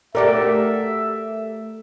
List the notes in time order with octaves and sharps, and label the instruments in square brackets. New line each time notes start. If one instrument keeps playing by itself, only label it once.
[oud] A3 F#4 G4 [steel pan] A#4 D5 [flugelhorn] E5